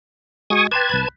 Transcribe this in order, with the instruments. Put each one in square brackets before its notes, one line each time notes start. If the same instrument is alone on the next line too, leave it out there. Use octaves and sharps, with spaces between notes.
[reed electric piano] G#3 F#4 D#5 [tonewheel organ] G#5 C#6 D#6
[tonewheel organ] B4 A5 G#6 [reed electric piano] G5 C6 D6
[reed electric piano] C2 B5 F#6